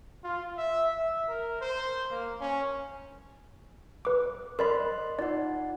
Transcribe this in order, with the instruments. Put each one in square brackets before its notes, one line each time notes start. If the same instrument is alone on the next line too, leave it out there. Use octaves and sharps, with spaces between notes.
[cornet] F4
E5
E5
A#4
C5
A#3
C#4
[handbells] B4 D6
[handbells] A#4 D5 B5 [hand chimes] C5 D#5 C6
[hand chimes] D#4 F4 F#5 [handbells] D5